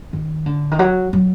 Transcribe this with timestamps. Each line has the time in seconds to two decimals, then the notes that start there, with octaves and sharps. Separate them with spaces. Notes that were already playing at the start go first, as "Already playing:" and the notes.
0.13 D#3
0.46 D3
0.71 D#3
0.79 F#3
1.13 F#3